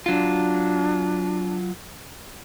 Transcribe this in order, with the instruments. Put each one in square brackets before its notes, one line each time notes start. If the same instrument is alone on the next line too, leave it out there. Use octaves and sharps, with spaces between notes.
[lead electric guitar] F#3 F4 [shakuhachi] D4